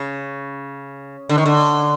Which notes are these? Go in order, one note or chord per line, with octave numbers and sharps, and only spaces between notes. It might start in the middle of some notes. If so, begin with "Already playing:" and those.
Already playing: C#3
D3
D#3
D3